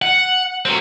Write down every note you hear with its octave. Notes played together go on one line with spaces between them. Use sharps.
F#5
F#3 C4